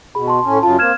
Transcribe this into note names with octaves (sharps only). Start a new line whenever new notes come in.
B2 G#4 B5
A5 C6
A2 C#4
F#2 C#3 F4 A5
A#3 C4 F6 G#6 E7